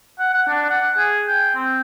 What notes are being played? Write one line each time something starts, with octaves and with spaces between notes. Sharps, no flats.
F#5
F#5
D4
F#5
G#4
G5
C4